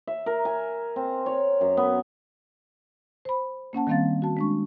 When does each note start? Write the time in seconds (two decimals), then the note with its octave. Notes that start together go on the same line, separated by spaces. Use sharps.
0.07 E5
0.26 A#4
0.45 G#5
0.96 C4
1.26 C#5
1.61 F#2
1.77 B3
3.25 C5 B5
3.73 A#3 C#4 F#5 A5
3.87 D#3 G3 A#3 C4 F5 A6
4.22 F#4 A5
4.37 G#3 D4 C#6